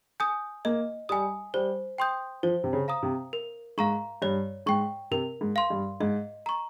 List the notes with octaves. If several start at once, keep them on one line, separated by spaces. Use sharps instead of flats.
G#5 D#6 G6
A#3 D#5
G3 G#5 D#6
G3 C5
G5 C6 D#6 G6
F3 C5
C3
C#3
F5 A#5 D#6
C3
A#4
G#2 F5 A#5 C#6
G2 C#5
G#2 G5 C#6
C3 A#4
G#2
F5 C6
G2
G#2 D#5
A#5 C#6